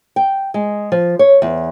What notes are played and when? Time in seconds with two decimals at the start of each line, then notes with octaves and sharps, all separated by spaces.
0.16 G5
0.54 G#3
0.92 F3
1.19 C#5
1.42 E2